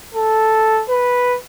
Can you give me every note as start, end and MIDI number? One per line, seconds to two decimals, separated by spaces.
0.14 0.83 69
0.89 1.38 71